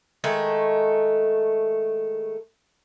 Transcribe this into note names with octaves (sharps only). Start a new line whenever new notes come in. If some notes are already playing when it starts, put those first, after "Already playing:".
D#3 G#3 A3